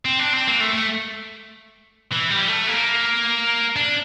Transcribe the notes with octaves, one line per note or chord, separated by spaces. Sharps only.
C4
D4
C4
A#3
A3
A3
E3
G3
A3
A#3
D4